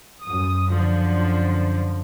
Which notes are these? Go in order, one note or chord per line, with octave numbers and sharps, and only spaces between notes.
F#2 D#6
F#2 D3 F3